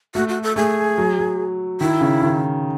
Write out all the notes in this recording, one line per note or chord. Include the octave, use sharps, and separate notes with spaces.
A3 F#4
F#4
A4
A3 G#4
F#3
F#3
D#3 E4
C#3
D#3